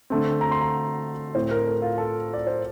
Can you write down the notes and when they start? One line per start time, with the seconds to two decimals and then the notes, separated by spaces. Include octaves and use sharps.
0.10 D3 A3 C4
0.41 A#5
0.52 C6
0.61 A#5
1.35 A2 A3 C4 C5
1.51 A#4
1.66 A4
1.82 F4
1.98 A4
2.34 D5
2.47 C5